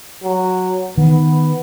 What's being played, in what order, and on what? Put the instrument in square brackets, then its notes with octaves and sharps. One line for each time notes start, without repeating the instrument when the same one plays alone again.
[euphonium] F#3
[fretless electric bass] D#3 [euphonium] B3